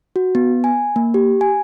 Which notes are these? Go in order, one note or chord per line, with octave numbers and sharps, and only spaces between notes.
F#4
B3
G#5
A#3
G4
G#5